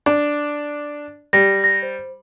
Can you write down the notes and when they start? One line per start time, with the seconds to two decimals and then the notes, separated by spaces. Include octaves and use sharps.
0.06 D4
1.33 G3 A#6
1.64 A#6
1.83 C5